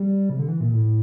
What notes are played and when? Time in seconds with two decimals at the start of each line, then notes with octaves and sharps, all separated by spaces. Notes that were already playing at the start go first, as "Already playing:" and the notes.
Already playing: G3
0.30 C3
0.39 D3
0.48 E3
0.61 A#2
0.73 A2